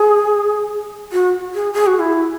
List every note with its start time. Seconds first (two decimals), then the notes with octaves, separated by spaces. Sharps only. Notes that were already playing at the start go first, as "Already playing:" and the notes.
Already playing: G#4
1.12 F#4
1.55 G#4
1.74 G#4
1.87 F#4
1.99 E4